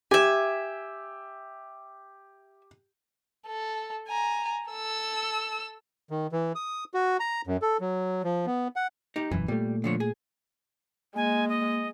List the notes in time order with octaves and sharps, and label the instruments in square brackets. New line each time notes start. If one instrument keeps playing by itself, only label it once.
[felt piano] G4 [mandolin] E5 G#5
[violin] A4
G#5 A#5
A4 E6
[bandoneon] D#3
E3
D#6
F#4
A#5
F#2
A4
F#3
F3
B3
F#5
[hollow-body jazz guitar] D#4 G4
[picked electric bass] E1 F#2 [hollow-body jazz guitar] E3
[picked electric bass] A#2 A3 [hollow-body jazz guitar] G3
[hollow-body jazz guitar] D3 F3 C#5
G#4
[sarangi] G#3 [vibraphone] A#3 [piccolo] G#5
[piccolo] D#5